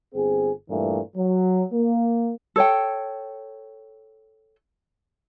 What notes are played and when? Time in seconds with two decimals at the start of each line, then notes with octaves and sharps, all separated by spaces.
0.14 G1 C4 G#4
0.70 G2 A#2 E3 A3
1.16 F#3
1.73 A#3
2.56 A4 C#5 G5